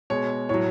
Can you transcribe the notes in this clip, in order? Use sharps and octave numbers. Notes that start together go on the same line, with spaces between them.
B2 G#3 C#5
A2 F#3 C#5